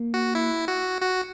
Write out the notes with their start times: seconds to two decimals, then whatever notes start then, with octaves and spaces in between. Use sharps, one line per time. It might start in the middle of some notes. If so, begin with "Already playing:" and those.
Already playing: A#3
0.14 F#4
0.35 E4
0.68 F#4
1.02 F#4